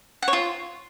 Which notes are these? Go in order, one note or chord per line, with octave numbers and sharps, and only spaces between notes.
F#5
C#5
F4